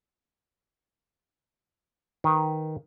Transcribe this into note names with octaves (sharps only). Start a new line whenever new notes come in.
D#3 B4